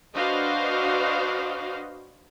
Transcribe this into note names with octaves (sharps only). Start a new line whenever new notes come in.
D4 F#4 B4 C5 D#5 F5